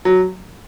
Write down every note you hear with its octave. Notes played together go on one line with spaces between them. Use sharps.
F#3